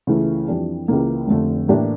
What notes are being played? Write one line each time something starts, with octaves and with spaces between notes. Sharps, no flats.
C#2 C#3 E3 A3 E4
F2 E3 G3 D4
C#2 C#3 E3 A#3
F1 F2 D3 A3
A2 E3 A#3 D4 G4